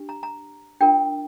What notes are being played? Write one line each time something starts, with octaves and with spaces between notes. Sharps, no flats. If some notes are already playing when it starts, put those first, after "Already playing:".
Already playing: D4 G4
A#5
A#5
D4 F4 A#4 G5